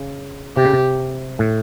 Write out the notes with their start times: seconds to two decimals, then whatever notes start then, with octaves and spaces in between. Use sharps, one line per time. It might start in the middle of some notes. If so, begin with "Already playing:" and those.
Already playing: C#3
0.56 C3 G4
0.65 C#3
0.73 C3
1.39 A2